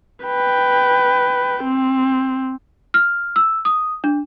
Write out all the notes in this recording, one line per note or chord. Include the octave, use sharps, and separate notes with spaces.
B4 G5
C4
F6
E6
D#6
D4